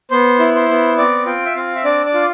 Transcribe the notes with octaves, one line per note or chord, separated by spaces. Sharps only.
B3 C5
E4
C5
B3
C4 D5
F4 G5
E5
C4 F5
E5
D4 D5
D5
F4